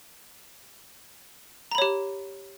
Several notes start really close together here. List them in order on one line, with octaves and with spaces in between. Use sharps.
A#5 B5 C#5 G4